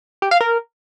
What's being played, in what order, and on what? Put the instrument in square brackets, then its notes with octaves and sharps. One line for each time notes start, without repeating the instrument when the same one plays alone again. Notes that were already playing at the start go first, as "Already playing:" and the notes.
[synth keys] G4
F5
A#4